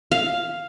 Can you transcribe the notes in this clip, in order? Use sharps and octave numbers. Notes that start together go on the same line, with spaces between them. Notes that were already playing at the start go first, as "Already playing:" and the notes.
F5